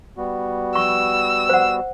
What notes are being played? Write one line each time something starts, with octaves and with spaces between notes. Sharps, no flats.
G3 B3 F#4
C#6 E6
C5 F#5